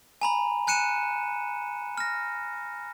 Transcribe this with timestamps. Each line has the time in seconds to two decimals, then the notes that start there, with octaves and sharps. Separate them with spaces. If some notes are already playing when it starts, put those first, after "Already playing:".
0.22 G#5 A#5 B5
0.67 G#5 F#6 C#7 D#7 E7
1.98 F6 A#6